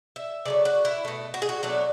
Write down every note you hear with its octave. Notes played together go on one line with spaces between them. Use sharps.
E5
C#3 F#3 A3 D5
F#4
E4
B2 A3
F#4
G#4
F#4
B2 F#3 A3 D4